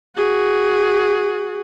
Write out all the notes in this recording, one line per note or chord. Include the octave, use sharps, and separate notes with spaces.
F#4 G#4